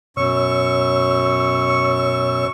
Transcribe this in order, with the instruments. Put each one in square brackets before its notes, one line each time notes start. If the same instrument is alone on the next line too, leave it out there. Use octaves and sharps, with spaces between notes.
[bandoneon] F#2 C#6 [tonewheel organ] B2 C#5 E6